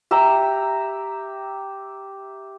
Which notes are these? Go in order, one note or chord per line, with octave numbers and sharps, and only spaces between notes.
G4 E5 G5 A#5